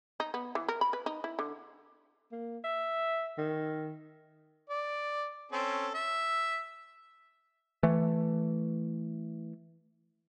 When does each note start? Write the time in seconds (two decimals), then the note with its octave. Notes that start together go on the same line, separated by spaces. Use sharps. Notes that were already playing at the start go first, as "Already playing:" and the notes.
0.20 D#4
0.34 B3
0.55 E3
0.68 A#4
0.81 B5
0.93 B4
1.06 D#4
1.24 E4
1.39 D3
2.32 A#3
2.64 E5
3.38 D#3
4.69 D5
5.52 C4 C#4 A4
5.94 E5
7.83 E3 A3